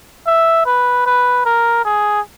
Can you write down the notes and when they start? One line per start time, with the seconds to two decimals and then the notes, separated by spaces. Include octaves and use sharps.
0.27 E5
0.66 B4
1.06 B4
1.46 A#4
1.85 G#4